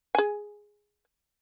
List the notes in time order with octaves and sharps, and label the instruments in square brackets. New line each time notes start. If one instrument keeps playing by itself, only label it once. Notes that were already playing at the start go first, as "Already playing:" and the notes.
[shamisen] G#4 G#5